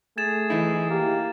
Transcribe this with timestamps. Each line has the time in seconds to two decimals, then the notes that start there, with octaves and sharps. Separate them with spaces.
0.18 A3 G#4 G#6 A6 E7
0.50 E3 D#4 E4
0.90 A#3 G4